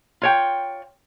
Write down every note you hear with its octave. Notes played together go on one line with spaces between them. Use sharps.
F4 C#5 G5